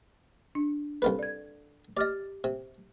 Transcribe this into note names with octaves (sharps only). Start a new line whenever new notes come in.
D4
C2 F4 A4 B4 B5
D5 G#6
G4 D5 D#5 F6 A6
C3